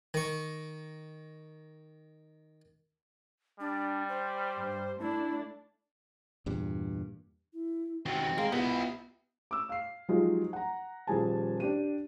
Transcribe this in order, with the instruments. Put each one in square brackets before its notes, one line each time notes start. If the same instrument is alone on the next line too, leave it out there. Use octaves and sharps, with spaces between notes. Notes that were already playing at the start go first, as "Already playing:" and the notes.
[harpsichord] D#3 C#6
[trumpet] G3 [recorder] D4
[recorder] C5
[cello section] G2
[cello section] A3 D4 [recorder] E4
[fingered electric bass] E2 G2 A#2
[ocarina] E4
[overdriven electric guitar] D#3 F#3 [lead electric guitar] C4 [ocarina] F#4
[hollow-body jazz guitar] G#3 [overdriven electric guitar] A#4 F5
[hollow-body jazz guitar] B3 [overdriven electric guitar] E4 G4 [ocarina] F4 [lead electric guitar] D#5 B5
[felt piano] D6 E6
F5 C7
F3 F#3 G#3 D#4 F4 G4
F#5 A#5
D#1 F3 G3 G#4 G#5 A5
D4 G4 D#7